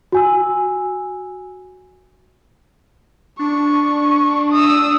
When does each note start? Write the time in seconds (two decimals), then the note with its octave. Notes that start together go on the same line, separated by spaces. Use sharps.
0.12 F#4 G#5 E6
3.39 D4 C#6
4.52 D#6 E6